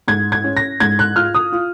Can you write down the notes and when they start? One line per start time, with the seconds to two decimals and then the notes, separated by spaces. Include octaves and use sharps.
0.08 G#2 G#6
0.32 G#6
0.44 C#4
0.57 A#6
0.80 G#2 G#6
0.99 F#6
1.16 F4 F6
1.34 D#6
1.53 F4